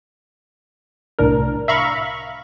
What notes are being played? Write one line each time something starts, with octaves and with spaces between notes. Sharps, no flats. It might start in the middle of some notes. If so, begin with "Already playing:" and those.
C2 A2 D4 A#4
E5 F5 A#5 B5 C#6